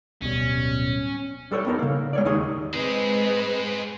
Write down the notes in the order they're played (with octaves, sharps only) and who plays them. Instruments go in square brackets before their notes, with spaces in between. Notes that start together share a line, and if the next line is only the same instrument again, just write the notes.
[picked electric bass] D1 B2 G3 [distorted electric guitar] C#4
[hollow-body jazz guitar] G3 A4 C5 C#5
B3 D#4 A#4
C#3 A#3
G#3 C#5 D5
D#2 D#3 D#4 G#4 C#5
[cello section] G#3 C4 D#5 [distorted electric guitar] G#4 C5 [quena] B4